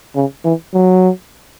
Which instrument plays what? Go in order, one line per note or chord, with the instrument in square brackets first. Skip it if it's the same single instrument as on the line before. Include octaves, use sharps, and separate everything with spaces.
[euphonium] C#3
E3
F#3